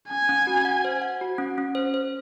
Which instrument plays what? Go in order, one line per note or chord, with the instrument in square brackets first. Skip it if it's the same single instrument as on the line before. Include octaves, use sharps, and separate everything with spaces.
[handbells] C#4 [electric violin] G#5
[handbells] C#4
F#4
F#5
C5
F#5
F#4
C#4
C#4
C5
C5